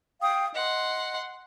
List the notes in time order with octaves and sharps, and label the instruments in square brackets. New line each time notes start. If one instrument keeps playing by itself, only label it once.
[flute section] F5 G5 D#6
[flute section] D#5 [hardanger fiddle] F#5 C6